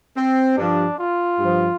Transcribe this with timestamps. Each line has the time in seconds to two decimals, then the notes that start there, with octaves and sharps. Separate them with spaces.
0.16 C4
0.57 G2 F3 D4
0.99 F4
1.38 G2 F3